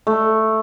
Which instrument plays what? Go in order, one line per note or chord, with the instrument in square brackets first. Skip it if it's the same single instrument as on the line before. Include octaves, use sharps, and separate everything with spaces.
[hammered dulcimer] A3